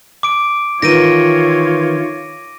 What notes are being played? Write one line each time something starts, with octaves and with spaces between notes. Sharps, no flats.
D6 D7
D#3 E3 F4 C#5 A#6 D7 D#7